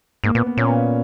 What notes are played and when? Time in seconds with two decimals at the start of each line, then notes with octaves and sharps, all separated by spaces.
0.24 G#2 A#3
0.35 A#2 B3
0.47 B3
0.57 A#2 C#4
0.68 B3